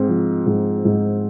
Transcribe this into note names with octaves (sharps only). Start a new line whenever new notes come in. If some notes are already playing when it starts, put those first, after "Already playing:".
Already playing: G#2 C4
F3
G#2
G#2